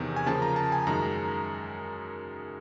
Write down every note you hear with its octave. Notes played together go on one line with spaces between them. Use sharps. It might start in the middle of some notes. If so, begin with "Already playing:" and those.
Already playing: E2 C3 D#3
G#5
C#3 F3 A#3 A5
A#5
A5
G#5
F#2 D#3 G#3 A#5